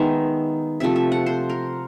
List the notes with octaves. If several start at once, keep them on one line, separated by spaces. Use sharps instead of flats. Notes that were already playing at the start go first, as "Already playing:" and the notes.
Already playing: D#3 G#3 B3 E5
C3 F3 A3 E5
E5
F#5
C5
A#4